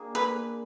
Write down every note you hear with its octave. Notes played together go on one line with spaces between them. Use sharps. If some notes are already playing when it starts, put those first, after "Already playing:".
Already playing: A#3 D4 G#4
B4